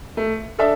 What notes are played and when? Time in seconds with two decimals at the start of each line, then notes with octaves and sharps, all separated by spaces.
0.17 A3
0.59 D4 A4 E5